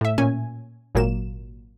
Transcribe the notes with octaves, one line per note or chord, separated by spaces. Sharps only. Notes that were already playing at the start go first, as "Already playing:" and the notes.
A2 E5
A#2 C#4 G#5
G#1 A#2 F#3 A#3 E7